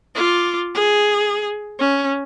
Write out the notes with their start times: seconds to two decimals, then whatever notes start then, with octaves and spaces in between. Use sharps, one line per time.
0.15 F4 D6
0.74 G#4
1.79 C#4